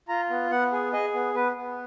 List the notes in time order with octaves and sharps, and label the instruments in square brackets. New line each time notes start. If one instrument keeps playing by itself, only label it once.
[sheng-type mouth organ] F4 A#5
B3
B3 F#5
G#4
G#4 D#5
B3
B3 B4
B3